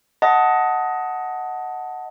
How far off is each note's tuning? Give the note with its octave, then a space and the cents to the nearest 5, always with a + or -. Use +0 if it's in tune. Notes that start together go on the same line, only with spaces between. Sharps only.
D#5 +15 F#5 +0 A5 +0